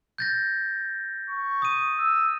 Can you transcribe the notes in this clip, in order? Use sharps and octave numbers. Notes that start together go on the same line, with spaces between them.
G6 A6 A#6
C#6
D#6 D#7
E6